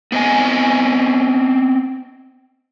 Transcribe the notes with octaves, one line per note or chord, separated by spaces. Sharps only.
B3 C4 D#5 G#5